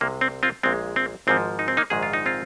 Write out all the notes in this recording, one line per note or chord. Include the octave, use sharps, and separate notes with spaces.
C2 C3 G#3 A#3
C4
C4 F4
A#1 A#2 G#3 C4
C4
G#1 G#2 F3 C4
D#4
C4
A#3 D#4
A#1 G#2 D#3 G#3 G#4
F4
D#4
C4 F4